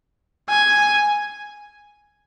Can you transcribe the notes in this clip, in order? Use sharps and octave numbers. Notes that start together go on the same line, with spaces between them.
G#5